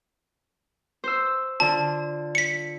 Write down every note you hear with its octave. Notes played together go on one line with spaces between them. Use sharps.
C5 E6
D3 F4 A5
B6 C#7